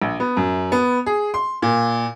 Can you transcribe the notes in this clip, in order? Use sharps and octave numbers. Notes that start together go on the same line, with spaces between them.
A#1
B3
F#2
B3
G#4
C6
A#2